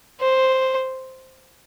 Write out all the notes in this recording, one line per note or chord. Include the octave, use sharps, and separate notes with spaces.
C5